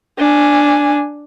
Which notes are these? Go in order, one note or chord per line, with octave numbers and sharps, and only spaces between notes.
D4 G#5